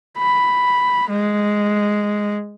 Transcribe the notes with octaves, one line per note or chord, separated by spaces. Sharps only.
B5
G#3